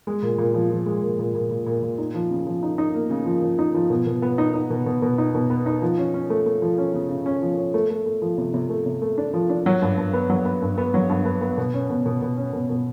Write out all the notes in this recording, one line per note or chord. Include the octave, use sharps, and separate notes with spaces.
G#3
A#2
A#2
F3
F3
G#3
A#2
A#2
A#2
A#2
A#2
A#2
D#4
F3
C#3
F3
D#4
D#4
A#3
C#3
F3
F3
D#4
F3
B2
B2
B3
D#4
D#4
B2
B2
B2
D#4
B2
B3
D#4
F3
C#4
C#4
A3
A3
F3
C#4
C#3
C#3
C#4
F3
C#4
A3
A3
A3
F3
C3
C3
A3
C3
A3
D4
F3
D4
F#3
G2
G2
B3
F#3
B3
G2
B3
F#3
G2
B3
B3
B2
C#4
B2
B2
B2
C#4
B2
B2